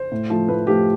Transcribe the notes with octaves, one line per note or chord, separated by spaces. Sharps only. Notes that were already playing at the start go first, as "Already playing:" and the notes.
Already playing: C5
A2
F3 A3
A2 B4
F3 A3 G4